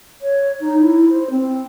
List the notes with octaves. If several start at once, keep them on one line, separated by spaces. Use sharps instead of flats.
C#5
D#4
E4
C5
C4